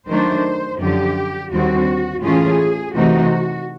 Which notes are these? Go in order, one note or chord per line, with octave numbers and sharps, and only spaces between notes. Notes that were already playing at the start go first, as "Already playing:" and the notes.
D#3 F#3 A3 D4 C5
F#2 D3 F3 G4
D#2 D3 G3 C4 F#4
A2 E3 A3 C#4 F4 G#4
C3 E3 A3 C4 D#4 F#4